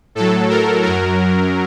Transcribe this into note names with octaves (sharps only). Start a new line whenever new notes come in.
A2 F#3 A4
A#4
F#2 F#3 A#4